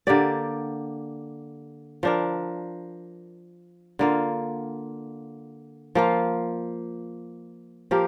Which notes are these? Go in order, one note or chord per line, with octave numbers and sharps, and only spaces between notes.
D3 A#3 G4 D5
F3 D4 A#4
D3 A#3 F4
F3 A#3 F4
F3 A#3 G4 A#4